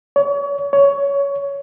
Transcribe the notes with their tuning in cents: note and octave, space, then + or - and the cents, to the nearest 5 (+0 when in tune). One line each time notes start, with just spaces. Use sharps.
C#5 +35
C#5 +15